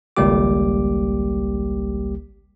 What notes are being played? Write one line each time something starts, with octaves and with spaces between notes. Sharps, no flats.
G#1 C#2 G3 A#3 G4 D6